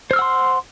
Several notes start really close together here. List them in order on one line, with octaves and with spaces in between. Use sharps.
C5 F6 E6 F#5 C6